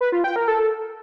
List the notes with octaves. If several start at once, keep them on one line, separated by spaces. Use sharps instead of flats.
B4
F4
G5
A#4
A4